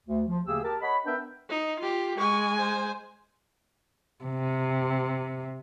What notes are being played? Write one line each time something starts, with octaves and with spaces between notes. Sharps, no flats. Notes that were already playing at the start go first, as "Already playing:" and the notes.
D2
F3
D2 C#3 A#3 G4 G#4 E6
G4 A#4 A5
C#5 D#5 F#5 B5
B3 D4 A#4 B4 E5 G5
D#4
F4 G4
G#3 G#5 C#6
C5
C3